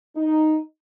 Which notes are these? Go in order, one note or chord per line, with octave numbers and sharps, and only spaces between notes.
D#4